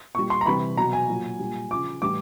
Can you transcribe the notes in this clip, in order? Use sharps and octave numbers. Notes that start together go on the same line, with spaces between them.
A#2 G3 C#6
C6
A#5
C3 E3 G3 B5
B2 F#3 A#5
G#5
A#2 F#3
A#2 G3
C#3 F3 D6
A2 E3 G3 D6